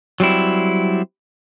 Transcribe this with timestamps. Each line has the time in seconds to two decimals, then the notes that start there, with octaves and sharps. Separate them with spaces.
0.20 F#3 G3 C4 E4